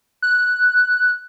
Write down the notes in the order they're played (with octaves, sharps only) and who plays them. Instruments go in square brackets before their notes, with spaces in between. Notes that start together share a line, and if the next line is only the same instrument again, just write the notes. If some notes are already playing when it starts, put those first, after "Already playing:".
[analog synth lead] F#6